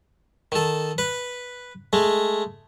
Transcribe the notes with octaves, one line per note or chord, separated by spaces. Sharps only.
D#3 A4
B4
G#3 A3